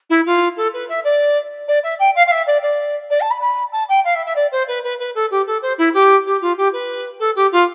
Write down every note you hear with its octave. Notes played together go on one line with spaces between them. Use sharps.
E4
F4
A4
B4
E5
D5
D5
E5
G5
F5
F5
E5
D5
D5
D5
A5
B5
B5
A5
G5
F5
E5
E5
D5
C5
B4
B4
B4
A4
G4
A4
C5
E4
G4
G4
F4
G4
B4
A4
G4
F4